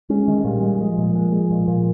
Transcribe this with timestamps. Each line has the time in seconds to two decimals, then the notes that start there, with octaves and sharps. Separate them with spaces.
0.10 G#3 C#4
0.28 D#3
0.45 A#2 G3
0.62 G#3
0.80 F3 G#3
0.98 A#2
1.15 G#3
1.32 G#3
1.51 A#2
1.68 A#2